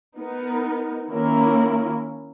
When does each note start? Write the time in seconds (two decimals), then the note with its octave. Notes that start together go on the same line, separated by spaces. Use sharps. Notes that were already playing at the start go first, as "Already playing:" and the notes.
0.16 B3 D#4 A#4
1.10 D#3 A#3 C#4 E4 A#4